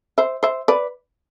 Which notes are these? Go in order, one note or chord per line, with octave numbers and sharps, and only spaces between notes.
C5 E5
C5 E5
B4 D5